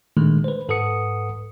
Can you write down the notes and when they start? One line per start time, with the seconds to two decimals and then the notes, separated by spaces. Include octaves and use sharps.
0.17 A#2 D3 D#3 G#3 A3
0.44 B4 C5
0.69 G#2 A4 B4 F#5 D#6 C#7